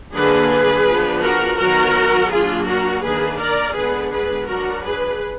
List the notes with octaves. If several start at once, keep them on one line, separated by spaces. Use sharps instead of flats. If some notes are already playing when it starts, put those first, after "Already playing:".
D3 F#3 A#3 D4 G#4 B4
F3 B3 D4
F#4 A#4
D#3 F#3 B3 F#4 A#4
F#3 A#3 D4 F4 G#4
F#4 A#4
D#3 A#3 D4 G#4 B4
A#4 D5
D3 G#3 B3 D4 G#4 B4
G#4 B4
F#3 D4 F#4 A#4
G#4 B4